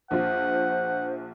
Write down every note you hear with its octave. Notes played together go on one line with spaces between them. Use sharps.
A#1 F4 C5 F#5